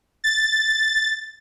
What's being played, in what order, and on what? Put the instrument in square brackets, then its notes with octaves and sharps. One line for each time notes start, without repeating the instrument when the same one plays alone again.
[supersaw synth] A6